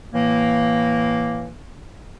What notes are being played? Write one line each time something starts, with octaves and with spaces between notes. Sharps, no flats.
A2 E3 A#3